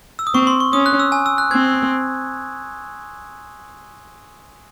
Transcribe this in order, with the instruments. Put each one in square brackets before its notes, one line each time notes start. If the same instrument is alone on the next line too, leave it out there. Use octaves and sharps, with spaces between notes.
[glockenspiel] E6
D#6
[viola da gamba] C4 [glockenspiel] C#6
[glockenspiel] C6
C#6
[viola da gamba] C#4 [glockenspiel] D#6
[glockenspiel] F#6
E6
G#5
E6
F#6
[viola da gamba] C4 [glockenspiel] G#6